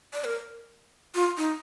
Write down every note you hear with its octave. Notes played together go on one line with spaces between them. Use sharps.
D5
A#4
F4
D#4